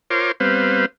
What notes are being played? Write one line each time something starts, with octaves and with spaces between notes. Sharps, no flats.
F4 A#4 C5 C#5 C6 D6
G3 B3 C4 B4 C5 F5